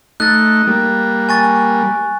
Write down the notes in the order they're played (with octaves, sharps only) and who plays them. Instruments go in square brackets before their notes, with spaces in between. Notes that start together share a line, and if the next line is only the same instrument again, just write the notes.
[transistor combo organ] A3 D#4 [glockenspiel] F#6 A6
[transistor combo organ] G3 A#3
[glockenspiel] G#5 C#6 A6